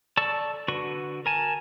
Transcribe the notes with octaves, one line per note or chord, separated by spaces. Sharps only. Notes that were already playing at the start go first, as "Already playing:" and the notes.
A4 D5 A5 C#6 E6
D3 F#4 B4 C#6
A#4 G#5 A5